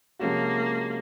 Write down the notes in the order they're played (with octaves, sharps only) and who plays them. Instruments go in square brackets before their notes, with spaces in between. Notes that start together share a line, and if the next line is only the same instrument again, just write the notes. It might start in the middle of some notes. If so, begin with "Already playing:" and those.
[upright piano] C3 F3 G#3 C#4 F#4 [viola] A#3